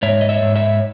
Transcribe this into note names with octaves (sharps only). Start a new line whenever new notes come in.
G#2 C#5 E5
D#5
C#5 E5
G#2
C#5 E5